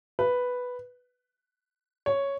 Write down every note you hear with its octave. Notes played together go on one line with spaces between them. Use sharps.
B4
C#5